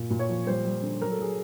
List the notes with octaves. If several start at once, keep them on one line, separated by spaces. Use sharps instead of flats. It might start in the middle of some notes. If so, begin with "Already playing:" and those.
Already playing: A#2
A#2
C#5
F3
G3 C5
G3
D3
F#3 A#4
A4
F#3 G#4